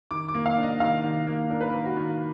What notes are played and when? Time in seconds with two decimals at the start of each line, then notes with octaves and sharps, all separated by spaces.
0.11 D#3 D6
0.28 D6
0.34 A#3
0.46 F5
0.57 D4
0.63 D#5
0.80 D#3 F5
1.04 D#3
1.27 A#3
1.50 D4 A#4
1.61 B4
1.70 D#3 A#4
1.85 F#4
1.96 D#3